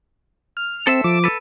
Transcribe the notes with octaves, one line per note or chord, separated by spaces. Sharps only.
F6
C4 A4 C5 E5
F3 D6
A4 B4